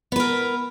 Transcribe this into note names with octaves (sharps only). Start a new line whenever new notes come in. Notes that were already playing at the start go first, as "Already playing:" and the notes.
B3 A#4 B4